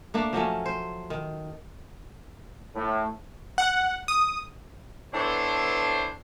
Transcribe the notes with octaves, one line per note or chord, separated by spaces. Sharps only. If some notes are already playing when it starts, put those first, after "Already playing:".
A3 A#3 D4
F3 F#3 A3 C#4
C5
D#3
A2
F#5
D#6
E3 B3 D4 A4 C5 C#5